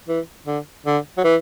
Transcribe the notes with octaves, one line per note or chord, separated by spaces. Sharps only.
E3
D3
D3
F#3
E3